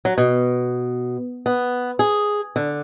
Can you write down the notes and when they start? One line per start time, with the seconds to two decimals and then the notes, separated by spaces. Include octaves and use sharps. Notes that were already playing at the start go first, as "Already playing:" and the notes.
0.05 F#3
0.18 B2
1.46 B3
1.99 G#4
2.56 D3